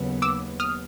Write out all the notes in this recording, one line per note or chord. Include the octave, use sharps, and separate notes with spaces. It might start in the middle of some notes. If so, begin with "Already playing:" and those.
Already playing: D#2 C#3 F#3 B3
D6 E6
D#6 F6